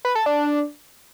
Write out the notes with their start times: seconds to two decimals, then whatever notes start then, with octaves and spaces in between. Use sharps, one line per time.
0.05 B4
0.15 A4
0.26 D4